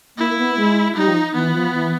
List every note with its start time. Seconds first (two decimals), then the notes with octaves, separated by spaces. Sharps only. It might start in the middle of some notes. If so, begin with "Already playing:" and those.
0.17 A#3 E4
0.38 B3
0.57 G#3
0.96 G3 D#4
1.08 F3
1.34 E3 B3
1.53 F3
1.73 E3